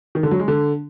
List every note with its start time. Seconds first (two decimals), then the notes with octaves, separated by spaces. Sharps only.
0.15 D#3
0.23 D3
0.31 F#3
0.40 G#3
0.48 D3